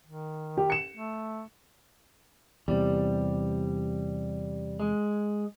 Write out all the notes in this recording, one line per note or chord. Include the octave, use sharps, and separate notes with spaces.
D#3
G4
C#7 E7
A3
E2 C3 G3
G#3